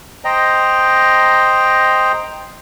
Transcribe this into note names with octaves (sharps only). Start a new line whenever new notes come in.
C5 D#5 G5 A#5